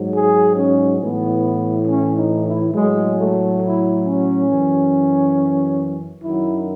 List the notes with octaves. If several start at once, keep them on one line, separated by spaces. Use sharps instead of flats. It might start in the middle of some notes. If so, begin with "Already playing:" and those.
Already playing: G#2 F#3
G#4
C#4
A2 E3 B3
C#4
D#4
E4
A2 F#3 G#3
A3
E4
C#4
F#2 E3
F#2 D#3 F#3 E4